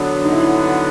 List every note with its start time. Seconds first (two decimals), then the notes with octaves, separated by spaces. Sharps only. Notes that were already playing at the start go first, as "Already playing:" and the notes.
Already playing: D3 F#3 B3 D4
0.25 D#4
0.32 E4